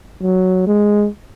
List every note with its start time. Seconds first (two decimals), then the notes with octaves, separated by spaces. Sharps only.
0.22 F#3
0.67 G#3